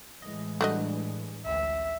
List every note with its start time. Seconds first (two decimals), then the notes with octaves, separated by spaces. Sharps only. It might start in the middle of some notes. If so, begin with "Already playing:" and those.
0.22 A2 E3 G#3 D#5
0.61 G3 A3 D4 F#4 D#5
1.46 A1 D2 E5